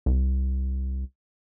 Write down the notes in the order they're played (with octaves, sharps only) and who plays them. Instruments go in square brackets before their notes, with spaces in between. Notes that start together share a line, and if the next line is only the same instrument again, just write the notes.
[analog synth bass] C2